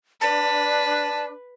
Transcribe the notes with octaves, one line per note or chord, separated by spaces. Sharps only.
D4 B4 A5